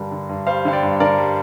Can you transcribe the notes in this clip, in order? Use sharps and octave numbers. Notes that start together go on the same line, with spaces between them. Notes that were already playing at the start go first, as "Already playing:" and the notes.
Already playing: G2 D3 G3 D4 A#4
D3
G2
G3 C5 F5
D3 F5
D5 G5
G2
D3 A#4 D5
G3